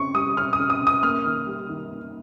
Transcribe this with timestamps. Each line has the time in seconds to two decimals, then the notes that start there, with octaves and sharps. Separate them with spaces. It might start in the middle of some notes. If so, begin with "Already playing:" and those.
Already playing: C#3 C4 C#6
0.15 G3 D#6
0.37 C#3 F6
0.53 D#6
0.60 C#3
0.70 D#6
0.81 C#3
0.87 D#6
1.03 A#3 F6
1.26 D#3
1.47 G3
1.69 D#3
1.91 A#3